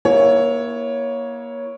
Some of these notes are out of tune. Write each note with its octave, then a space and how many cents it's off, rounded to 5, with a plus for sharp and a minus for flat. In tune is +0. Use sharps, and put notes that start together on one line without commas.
A#3 +30 E4 +0 C#5 +0